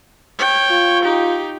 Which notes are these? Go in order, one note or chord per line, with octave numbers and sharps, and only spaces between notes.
C#5 G5
F4
D#4 G4